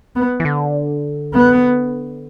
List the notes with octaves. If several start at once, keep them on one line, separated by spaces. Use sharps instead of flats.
B3
E3
D3
B3